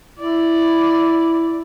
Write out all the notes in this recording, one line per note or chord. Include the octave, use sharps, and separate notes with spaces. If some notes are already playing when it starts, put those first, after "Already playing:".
E4 D5